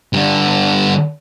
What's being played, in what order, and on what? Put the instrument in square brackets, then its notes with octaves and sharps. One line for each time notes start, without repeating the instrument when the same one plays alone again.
[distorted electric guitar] G2 D3